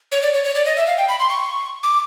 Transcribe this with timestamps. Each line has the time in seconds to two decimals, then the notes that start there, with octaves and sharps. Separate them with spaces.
0.12 C#5
0.22 D5
0.34 C#5
0.44 C#5
0.55 D5
0.65 D#5
0.77 E5
0.87 F5
0.98 G5
1.08 B5
1.19 C6
1.29 C#6
1.83 D6